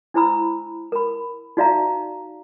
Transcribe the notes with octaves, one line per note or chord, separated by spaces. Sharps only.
D4 E4 C5 A#5 B5 E6
A#4 B5
D#4 F#4 D5 E5 F5 A#5